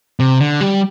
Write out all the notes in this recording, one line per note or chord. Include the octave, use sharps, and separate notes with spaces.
C3
D3
G3